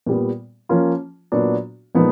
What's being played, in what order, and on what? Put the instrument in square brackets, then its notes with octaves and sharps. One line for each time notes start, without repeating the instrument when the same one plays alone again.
[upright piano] A#2 G3 B3
F3 A#3 C#4 F4
A#2 F#3 B3 D4 F#4
A#2 F3 G#3 B3 D#4